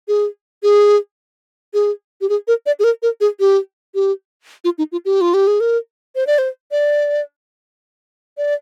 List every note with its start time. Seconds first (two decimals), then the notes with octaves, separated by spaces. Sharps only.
0.08 G#4
0.63 G#4
1.74 G#4
2.21 G4
2.29 G#4
2.48 A#4
2.66 D5
2.79 G#4
2.84 A#4
3.02 A#4
3.21 G#4
3.40 G4
3.95 G4
4.64 F4
4.78 D#4
4.92 F4
5.05 G4
5.21 F4
5.34 G4
5.47 G#4
5.60 A#4
6.16 C5
6.27 D5
6.38 C5
6.71 D5
8.37 D5